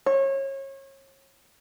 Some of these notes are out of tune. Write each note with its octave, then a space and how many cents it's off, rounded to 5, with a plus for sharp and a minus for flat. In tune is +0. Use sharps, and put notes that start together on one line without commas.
C#5 -30